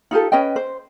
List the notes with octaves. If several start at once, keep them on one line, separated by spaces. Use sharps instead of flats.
D#4 F4 G4 A4
C#4 B4 D#5 G5
C5